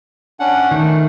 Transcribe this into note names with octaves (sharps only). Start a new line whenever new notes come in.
C#4 D4 F#5
D#3 A3